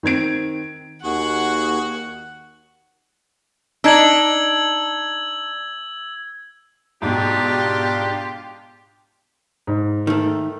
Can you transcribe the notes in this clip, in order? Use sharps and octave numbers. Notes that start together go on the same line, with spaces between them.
D#3 C4 G#6 D7
D#2 F#4 G#4 F#5
D4 D#4 E6 G#6 F#7
G#2 B2 D4 F4 G4
G#2
D#3 A3